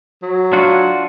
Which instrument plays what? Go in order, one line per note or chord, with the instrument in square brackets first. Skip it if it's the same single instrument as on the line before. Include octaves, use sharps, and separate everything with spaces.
[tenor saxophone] F#3
[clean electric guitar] D4 F4 F#4